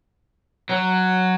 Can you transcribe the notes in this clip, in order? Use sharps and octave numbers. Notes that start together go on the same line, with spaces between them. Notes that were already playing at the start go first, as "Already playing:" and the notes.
F#3